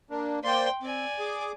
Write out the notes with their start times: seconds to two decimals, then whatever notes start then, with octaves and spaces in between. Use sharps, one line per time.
0.10 A#3 D4
0.44 A#3 C5 D5 G5 C6
0.82 C4 D5 G#5
1.19 G#4 D6